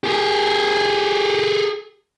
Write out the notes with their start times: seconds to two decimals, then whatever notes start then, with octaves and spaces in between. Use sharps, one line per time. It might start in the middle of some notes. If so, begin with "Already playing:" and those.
0.04 G4 G#4